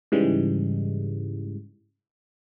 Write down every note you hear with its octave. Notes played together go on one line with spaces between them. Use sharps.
G#2 C#3 E3 G3 G#3